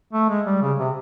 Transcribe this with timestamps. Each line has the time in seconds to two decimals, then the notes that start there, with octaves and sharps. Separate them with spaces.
0.13 A3
0.29 G#3
0.46 G3
0.62 C#3
0.79 C3